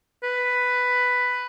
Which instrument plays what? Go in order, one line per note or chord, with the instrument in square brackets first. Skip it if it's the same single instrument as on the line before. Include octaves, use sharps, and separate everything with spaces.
[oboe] B4